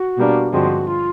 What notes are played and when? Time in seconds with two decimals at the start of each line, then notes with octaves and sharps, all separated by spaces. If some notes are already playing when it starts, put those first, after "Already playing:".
Already playing: F#4
0.18 B2 G3 A#3 D4
0.52 G2 D3 F3 G#3 C4 F#4
0.87 F4